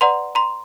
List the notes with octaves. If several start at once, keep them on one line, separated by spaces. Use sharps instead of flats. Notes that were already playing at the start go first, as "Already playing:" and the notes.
B4 D5 F#5 A#5 C6
A#5 C6